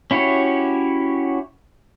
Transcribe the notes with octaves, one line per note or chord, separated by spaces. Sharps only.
C#4 E4 F#4 G4 C#5